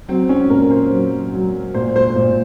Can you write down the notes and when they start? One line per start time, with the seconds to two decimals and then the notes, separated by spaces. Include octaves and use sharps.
0.08 F#3 C4
0.29 C#4
0.50 A#2 A#4
0.71 C5
0.91 F#3
1.33 F#3
1.74 A#2 C5
1.96 C5
2.16 A#2